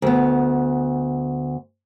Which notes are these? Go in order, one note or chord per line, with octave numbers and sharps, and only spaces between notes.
D2 B3